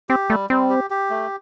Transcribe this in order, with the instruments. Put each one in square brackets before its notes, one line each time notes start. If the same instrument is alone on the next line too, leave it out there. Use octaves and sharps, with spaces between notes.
[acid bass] C4 [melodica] G4
[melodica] G3 [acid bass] A3
[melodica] G3 [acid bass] C4
[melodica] G4
G4
A3